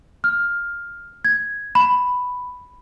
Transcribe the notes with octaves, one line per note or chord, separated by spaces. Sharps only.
F6
G#6
B5